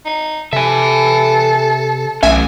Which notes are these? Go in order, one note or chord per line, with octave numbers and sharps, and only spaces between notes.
D#4
C3 A4 E5 G#5
B1 A3 C#4 E5 G#5